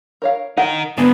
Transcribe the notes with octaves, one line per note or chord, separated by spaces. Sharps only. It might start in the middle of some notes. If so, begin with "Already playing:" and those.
A#4 C#5 F5
D#4 A#4 F#5
G#2 D3 G#3 B3 A5